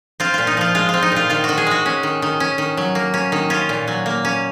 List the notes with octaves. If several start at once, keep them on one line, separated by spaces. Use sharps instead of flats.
C4 F4
A#2 F4
D#4
F3 F4
G#3 F4
C4 F4
D#4
A#2 F4
D#3 F4
F#4
D#3
G#4
G#3 F#4
C#4
D#3
D#3
C#4
D#3
F#3
A#3
C#4
D#3
C#4 F4
A#2
F#3
A#3
C#4